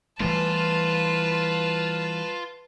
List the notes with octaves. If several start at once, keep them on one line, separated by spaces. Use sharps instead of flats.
E3 G3 A3 F4 B4 A5